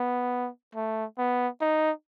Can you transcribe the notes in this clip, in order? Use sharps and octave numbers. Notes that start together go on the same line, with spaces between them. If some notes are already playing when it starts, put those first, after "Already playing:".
Already playing: B3
A3
B3
D#4